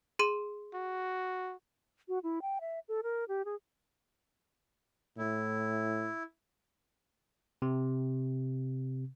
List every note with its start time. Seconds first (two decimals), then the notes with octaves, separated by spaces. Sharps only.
0.19 G#4 C6 D#7
0.74 F#4
2.08 F#4
2.23 E4
2.42 G5
2.61 E5
2.88 A4
3.03 A#4
3.28 G4
3.45 G#4
5.18 A2 E4
7.62 C3